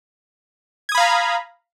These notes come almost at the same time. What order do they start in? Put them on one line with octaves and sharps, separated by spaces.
G#6 D#6 B5 F5 A#5